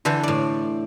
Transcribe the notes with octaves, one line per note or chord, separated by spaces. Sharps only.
D3 E3 A4 C5
A2 D5